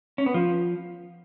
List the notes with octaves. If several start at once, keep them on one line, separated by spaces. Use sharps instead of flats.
C#4
B3
F3